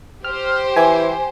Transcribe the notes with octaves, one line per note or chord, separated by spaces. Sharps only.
G4 C5 F6
E3 G#5